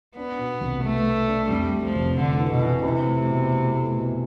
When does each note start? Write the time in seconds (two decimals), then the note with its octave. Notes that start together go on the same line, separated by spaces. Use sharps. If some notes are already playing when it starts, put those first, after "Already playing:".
0.17 B3 D4
0.39 B2
0.61 C2
0.83 A3 B3
1.05 B3
1.28 D4
1.50 F2 G3
1.72 A3
1.84 F3
1.95 F1
2.17 D3 A3
2.39 E3
2.51 B2
2.61 E3
2.83 C3 E4
3.07 A3
3.29 B2
3.50 A3
3.72 A3
3.96 B2